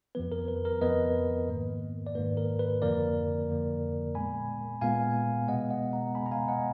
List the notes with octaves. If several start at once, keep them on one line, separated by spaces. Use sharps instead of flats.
F2 F3 B3 B4
A#4
B4
A#4
F2 F3 B3 B4 D#5
G#2 D#3 A#3
D5
G#2 D#3 A#3 B4
A#4
B4
F2 D3 F3 A#3 A#4 D5
F2 D3 F3 A#3
A#2 G#3 B3 G#5 B5
A#2 G#3 B3 F5 G#5
B2 G#3 B3 D#5 F#5
D#5 F#5
F#5 A#5
B2 G#3 B3 G#5 B5
A#5
F5 G#5
D#5 F#5